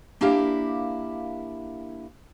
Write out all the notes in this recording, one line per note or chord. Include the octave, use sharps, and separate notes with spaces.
A#3 D4 E4 G4 A#4 F5